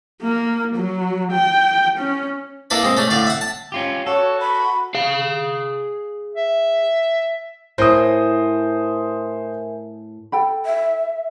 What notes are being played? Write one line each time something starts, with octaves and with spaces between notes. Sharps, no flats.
A#3
F#3
G5
C#4
A#3 D4 E4 A4 B4
G#3 C4
A3 C#4 D4
A2 D3 D5 F5
E5 F#5
A5
C#4 F4 G4
F#4 A4 C#5
B5
G#4 F5
E5
A2 A#4 C5 E5 G#5 D#6
A4 G5 B5
E5